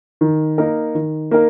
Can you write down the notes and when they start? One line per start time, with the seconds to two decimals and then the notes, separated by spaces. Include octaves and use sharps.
0.21 D#3
0.58 A#3 D#4 A#4
0.95 D#3
1.31 A#3 D#4 A#4